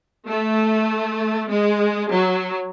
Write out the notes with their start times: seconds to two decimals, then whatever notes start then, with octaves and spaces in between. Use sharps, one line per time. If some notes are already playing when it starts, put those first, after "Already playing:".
0.29 A3
1.50 G#3
2.11 F#3